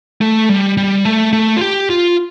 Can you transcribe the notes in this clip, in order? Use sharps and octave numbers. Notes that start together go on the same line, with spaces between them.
A3
G3
G3
A3
A3
F4
G4
F4